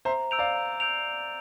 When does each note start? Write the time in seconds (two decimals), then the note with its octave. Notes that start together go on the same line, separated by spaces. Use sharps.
0.05 C5 E5 A#5
0.31 E6 G6 D7 F7
0.39 D5 F5
0.55 A#5
0.80 E6 G6 D7 F7
1.06 G6